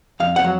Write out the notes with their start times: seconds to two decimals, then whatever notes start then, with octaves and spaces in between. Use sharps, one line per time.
0.20 F2 F5
0.36 F#5
0.45 F#3